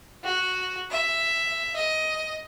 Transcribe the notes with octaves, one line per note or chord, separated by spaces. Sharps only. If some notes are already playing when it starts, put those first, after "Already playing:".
F#4
E5
D#5